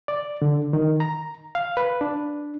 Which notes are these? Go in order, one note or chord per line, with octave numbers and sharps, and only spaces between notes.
D5
D3
D#3
A#5
F5
B4
D4